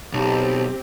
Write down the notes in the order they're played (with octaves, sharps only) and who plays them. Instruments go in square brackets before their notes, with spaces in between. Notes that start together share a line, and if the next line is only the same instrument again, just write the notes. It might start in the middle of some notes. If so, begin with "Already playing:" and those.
[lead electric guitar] B1 [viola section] C4 G4